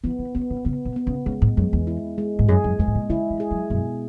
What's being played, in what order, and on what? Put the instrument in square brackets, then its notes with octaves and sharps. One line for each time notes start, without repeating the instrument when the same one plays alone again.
[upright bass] E3 [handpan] B3
[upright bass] E3
[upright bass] C#3 [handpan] B3
[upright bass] C#3
[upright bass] C#3 [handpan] B3
[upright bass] B2
[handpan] B3
[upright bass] C#3
[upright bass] C#3 [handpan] G#3
[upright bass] G#2
[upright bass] F#2 [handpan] G#3
[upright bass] E2
[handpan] E4
G#3
[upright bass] G#2
[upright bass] F#2 [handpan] G#4
[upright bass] F#2
[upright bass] F#2 [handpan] G#3
[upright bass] G#2
B2
[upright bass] C#3 [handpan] E4
[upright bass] E3
[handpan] G#4
[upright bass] F#3
[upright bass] F#2 [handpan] B2